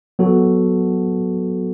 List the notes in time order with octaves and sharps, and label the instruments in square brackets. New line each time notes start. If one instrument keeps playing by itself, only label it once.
[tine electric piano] F#3 B3 F#4 A4